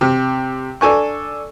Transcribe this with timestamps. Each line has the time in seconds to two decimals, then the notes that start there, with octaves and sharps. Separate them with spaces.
0.01 C3
0.81 D4 A4 G#5 C#6